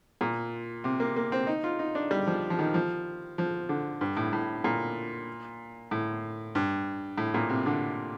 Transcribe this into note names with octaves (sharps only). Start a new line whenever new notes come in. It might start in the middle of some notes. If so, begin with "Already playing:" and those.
A#2
C3
A#3
A#3
C4
D#4
F4
D#4
D4
G3
F3
F3
D#3
F3
F3
D3
G2
A2
A2
A#2
A2
G2
A2
A#2
C3
D3